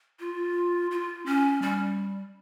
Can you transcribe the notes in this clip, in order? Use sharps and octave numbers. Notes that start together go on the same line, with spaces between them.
F4
F4
C#4
G3